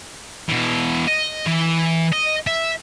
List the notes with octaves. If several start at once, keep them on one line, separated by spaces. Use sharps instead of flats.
B2 E3
D#5
E3
D#5
E5